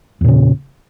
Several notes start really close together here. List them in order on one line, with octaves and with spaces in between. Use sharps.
E2 A#2 C#3